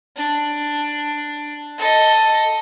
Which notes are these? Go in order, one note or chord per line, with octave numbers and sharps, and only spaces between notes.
D4
A4 D#5